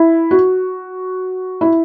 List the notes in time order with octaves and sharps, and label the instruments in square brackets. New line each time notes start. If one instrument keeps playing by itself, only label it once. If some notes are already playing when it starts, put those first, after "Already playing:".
Already playing: [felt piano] E4
F#4
E4